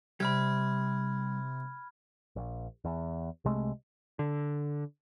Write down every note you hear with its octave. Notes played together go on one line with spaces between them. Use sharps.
C3 G3 B5 F6 G#6
A#1
E2
C2 C3 G#3 A3
D3